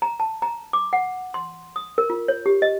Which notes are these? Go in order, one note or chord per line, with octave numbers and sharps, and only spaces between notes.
A#5
A5
A#5
D6
F#5
C6
D#6
A#4
F4
C#5
G4
D#5